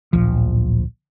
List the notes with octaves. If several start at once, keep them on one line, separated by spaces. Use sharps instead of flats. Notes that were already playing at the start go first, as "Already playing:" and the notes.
D1 A#1 F3